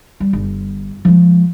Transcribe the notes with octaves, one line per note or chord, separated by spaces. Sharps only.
G3
G1
F3 G#3